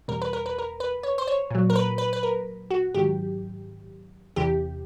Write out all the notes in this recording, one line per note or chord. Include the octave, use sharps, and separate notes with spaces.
E2 B2 G3 A#4
B4
A#4
B4
A#4
B4
C#5
C5
C#5
A#2 F#3
A#4
B4
B4
B4
A#4
F#4
G#2 D#3 F#3 G4
E2 C3 E3 G4